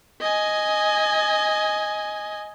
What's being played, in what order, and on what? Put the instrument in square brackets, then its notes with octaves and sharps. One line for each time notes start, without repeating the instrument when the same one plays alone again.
[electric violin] D#5 G#5